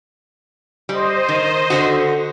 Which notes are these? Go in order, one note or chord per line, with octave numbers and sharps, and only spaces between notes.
G3 C5 D#5
D#3
D3 F#4